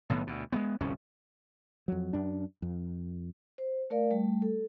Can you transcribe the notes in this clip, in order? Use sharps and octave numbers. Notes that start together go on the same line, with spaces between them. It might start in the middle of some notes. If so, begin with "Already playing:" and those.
B1 A2 D#3 B3
D2 B2
G#3 A#3 B3
D1 C2 F2 C#4
F2 F#3
F#2 D4
F2
C5
A3 A#4 D5 F5
G3 A3
A4